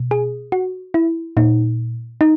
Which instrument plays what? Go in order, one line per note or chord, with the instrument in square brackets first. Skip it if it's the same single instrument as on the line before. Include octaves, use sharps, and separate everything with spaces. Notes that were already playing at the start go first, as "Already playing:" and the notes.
Already playing: [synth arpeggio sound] B2
G#4
F#4
E4
A#2 D#4
D#4